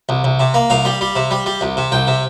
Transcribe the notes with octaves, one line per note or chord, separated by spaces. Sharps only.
C2
C2
C3
A#3
C2 F5
G3
G3
C3
G3
G3
C2
C3
C2 G5
C3